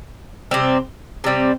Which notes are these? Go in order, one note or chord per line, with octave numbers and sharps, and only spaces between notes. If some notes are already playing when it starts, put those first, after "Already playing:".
C3 G3 C4
C3 G3 C4